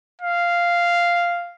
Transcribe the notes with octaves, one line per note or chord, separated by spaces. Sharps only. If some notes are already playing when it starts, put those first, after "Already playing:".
F5